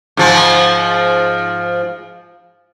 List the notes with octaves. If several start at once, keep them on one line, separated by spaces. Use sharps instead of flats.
G#2 F3